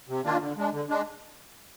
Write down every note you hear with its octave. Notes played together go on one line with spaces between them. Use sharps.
C3
D#3 A#3 D4 F4
D3
G#3 D4
D3
G#3 D4